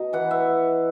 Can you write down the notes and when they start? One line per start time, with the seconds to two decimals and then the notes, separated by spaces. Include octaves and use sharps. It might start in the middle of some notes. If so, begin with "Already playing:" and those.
Already playing: B2 D#4
0.13 E3 F#5
0.31 E5